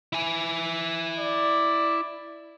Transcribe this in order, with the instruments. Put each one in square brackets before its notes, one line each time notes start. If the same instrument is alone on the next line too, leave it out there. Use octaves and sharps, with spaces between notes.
[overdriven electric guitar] E4 G#5
[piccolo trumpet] D5